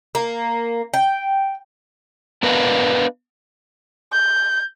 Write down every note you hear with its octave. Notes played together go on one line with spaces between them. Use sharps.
A#3
G5
B3 D4 A#4 B4 D#5 F5
G6